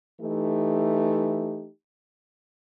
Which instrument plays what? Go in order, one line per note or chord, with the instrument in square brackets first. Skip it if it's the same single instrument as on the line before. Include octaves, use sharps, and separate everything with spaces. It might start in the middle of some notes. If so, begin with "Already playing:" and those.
[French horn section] E3 A3 D#4 G4